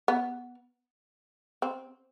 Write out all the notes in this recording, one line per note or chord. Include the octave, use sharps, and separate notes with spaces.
B3
C4